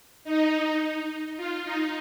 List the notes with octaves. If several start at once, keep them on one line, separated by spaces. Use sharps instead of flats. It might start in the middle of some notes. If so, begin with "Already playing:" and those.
D#4
F4
D#4